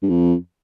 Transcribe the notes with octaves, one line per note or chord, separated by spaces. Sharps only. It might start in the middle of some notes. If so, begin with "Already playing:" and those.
G2
F2